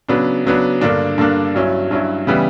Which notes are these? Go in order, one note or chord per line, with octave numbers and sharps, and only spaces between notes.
C#3 F#3 B3 D4
C#3 F#3 B3 D4
G2 D3 A#3 D4
G2 D3 A#3 D4
G2 F#3 C#4 E4
G2 F#3 C#4 E4
C#3 E3 G3 B3